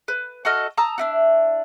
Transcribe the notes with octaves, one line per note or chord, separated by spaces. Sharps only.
B4
F#4 A4 D#5 F6
A5 A#5 D#6 E6
D4 E4 F#4